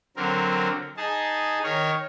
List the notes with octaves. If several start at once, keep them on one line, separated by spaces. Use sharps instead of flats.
D3 F#3 C4 A#4
D#4 G#4 A5
D#3 A#4 C#5